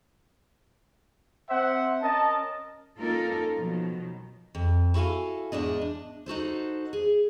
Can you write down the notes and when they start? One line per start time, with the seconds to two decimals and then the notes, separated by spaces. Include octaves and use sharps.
1.49 C4 C5 E5 F#5
2.01 C#4 A#4 D#5 A5
2.99 A#3 C#4 D#4 F4 A4 A#4
3.56 B2 D#3 F3 F#3
4.55 F2
4.94 E4 F#4 A4 F5 G#5
5.52 E2 G#2 D4 D#5
5.81 D4
6.26 D#4 F#4 A4 C5
6.93 G#4